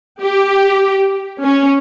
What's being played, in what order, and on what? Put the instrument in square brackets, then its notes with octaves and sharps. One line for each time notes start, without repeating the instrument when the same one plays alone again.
[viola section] G4
C#4